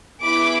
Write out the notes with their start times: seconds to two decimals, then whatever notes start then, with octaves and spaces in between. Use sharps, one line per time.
0.21 B3 E4 G#4 B5 D6